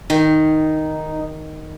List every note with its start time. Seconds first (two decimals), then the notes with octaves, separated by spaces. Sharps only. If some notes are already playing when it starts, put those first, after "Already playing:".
0.10 D#3 D#4